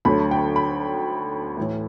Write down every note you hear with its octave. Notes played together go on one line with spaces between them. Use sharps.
D2 D3 F#3 A3 B5
G5
B5
A2 E3 A3